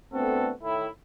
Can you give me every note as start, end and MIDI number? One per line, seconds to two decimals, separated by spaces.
0.13 0.52 57
0.13 0.52 59
0.13 0.52 60
0.13 0.52 62
0.13 0.52 66
0.13 0.52 69
0.62 0.87 45
0.62 0.87 51
0.62 0.87 64